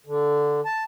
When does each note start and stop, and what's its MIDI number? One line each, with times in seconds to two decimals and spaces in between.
0.06 0.60 50
0.65 0.84 81